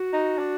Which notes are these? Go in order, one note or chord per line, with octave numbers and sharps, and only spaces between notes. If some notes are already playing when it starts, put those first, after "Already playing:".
Already playing: F#4
D#4
D4